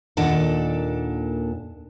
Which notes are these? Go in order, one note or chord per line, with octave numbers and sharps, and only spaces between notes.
D#2 A#2 D4 A4 F#5